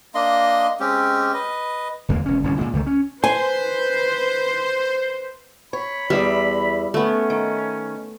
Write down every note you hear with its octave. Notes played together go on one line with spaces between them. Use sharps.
A#3 D4 D#5 C6
G#3 C4 C#4 G4
B4 D#5
D1 E2 G#3 A#3
E1 C#4
G1 C2 A2 C#4
A#2 G#3
C#2 G2 D#3 A3
C#4
B4 C5 G#5
C#5 B5
E2 G3 E5
A3 B3 C#4
D#3